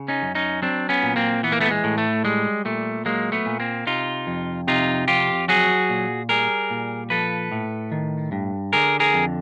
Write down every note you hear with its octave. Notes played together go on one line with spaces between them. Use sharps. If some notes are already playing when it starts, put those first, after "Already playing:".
Already playing: C#3
C#4 D#4
F#2
C#4 D#4
F#3 C4 D4
B3 C#4
A#2
A#3 C4
E3 B3
A#3
A3 B3
G#3
A2
A3
G3 G#3
A#2 A3
F#3 G#3 A#3
A3 B3
A#2
A#3 C4
C3 D#4 F4
F2
C3 D#4 F4
F2 F4 G4
F#3 F#4 G#4
A#2
G3 G#4 A#4
A#2
F3 A4 B4
A2
D#3
G2
D3 G#4 A#4
G#4 A#4
F2